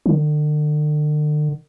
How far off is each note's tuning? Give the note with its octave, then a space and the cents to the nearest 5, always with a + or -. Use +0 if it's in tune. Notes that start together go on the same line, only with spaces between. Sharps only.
D3 +40